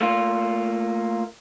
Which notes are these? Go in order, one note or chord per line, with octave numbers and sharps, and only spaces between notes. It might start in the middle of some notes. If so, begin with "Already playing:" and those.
A3 A#3 F4